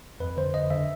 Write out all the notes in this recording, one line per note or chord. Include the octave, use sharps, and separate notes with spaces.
F2 B4
D3 C5
D3 D#5
D3 E5